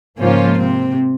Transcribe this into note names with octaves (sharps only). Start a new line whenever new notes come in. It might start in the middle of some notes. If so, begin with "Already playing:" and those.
G#2 C#3 F3 A#3 C#4 F4 C5
C3 C4